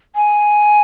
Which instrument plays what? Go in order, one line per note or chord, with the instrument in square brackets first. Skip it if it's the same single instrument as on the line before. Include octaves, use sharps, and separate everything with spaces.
[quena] G#5